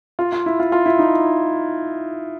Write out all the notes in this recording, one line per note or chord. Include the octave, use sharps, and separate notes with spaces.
F4
F4
E4
F4
F4
E4
D#4